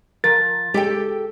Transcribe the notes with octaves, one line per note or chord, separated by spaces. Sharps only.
F3 A#4 A6
G#3 G4 A4 G5